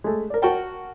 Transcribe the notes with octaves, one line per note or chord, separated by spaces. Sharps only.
G#3 A3
A#4 D5
F#4 A#4 G5 A5